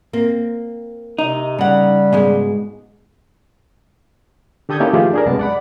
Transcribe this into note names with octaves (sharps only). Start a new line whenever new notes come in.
A#3 C4
C3 D#4
C#3 G3 F#5
G#2 B2 G#3
D3 G4 A4 D#6 G6 G#6
A#3 C#4 D#4 E4 G4 A4
D#3 F3 A3 F4 G4 G#4
D4 G#4 A#4
C2 F#2 G#3 B3 A5
D5 F#5 B5